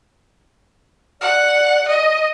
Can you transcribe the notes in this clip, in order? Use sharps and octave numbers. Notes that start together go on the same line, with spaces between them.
D5 F#5
D#5